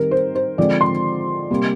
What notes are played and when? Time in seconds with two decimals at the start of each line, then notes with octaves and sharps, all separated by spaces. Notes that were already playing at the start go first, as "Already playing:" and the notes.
Already playing: D#3 G3 C4 A#4
0.11 C5
0.35 C5
0.58 D3 F3 G#3 C4 D5
0.81 C6
1.50 C3 G3 A#3